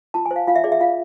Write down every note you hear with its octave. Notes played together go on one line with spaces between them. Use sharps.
F4 A5
G#5
C5
F5
F4 F5
E5
G#4 D5
E5
F4 F5